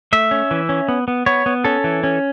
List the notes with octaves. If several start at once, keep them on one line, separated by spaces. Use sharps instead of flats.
A3 E5
C#4
E3
C#4
B3
B3
B3 C#5
B3
C#4 A4
E3
C#4